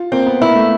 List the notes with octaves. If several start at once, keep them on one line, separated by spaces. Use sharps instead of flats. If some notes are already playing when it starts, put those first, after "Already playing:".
Already playing: F4
A#3 C4
B3
A#3 E4
A3